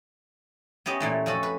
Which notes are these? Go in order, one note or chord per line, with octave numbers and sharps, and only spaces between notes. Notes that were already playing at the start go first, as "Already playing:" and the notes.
B3 C#4 G4 D#5
A#2 E3 A3
F2 C#4 F#4 A4
B4